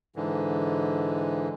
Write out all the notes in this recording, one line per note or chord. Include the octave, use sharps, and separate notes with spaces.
G#2 D3 E3